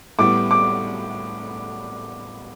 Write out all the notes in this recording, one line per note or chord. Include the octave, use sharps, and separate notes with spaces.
A2 G3 B3 D6
D6